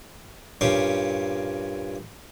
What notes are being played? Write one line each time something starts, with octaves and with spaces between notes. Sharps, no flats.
G2 A#2 C#4 G4 C#5 F5